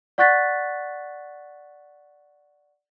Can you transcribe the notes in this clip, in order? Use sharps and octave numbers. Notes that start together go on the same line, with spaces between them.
D5 F#5 C#6 F#6 A6 B6